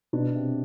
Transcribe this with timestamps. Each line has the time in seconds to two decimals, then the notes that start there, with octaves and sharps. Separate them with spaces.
0.13 B2 D4
0.35 C3